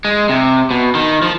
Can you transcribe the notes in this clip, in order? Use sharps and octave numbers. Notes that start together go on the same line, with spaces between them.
G#3
C3
B2
D#3
F3